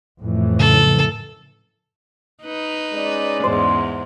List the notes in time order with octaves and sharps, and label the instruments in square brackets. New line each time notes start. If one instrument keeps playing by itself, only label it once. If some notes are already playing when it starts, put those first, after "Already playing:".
[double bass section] F2 A2 E3
[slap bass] C#3 F3 F#3 [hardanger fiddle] A4
[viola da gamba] D#4 B4
[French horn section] G#3 C#4 D5
[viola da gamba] E2 G#2 [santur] C5